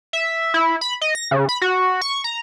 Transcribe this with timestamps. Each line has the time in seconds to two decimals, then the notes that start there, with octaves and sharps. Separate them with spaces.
0.13 E5
0.54 E4
0.81 B5
1.01 D#5
1.15 A#6
1.31 C#3
1.49 B5
1.62 F#4
2.01 C#6
2.24 A#5